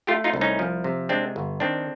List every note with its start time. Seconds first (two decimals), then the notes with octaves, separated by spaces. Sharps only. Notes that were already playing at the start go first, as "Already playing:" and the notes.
0.07 A3 F4 G4
0.24 D#4 F4
0.34 C2
0.41 C#4 D#4
0.59 F3
0.84 C3
1.09 G#3 C4 D4
1.36 G1
1.60 D#3 C4 D4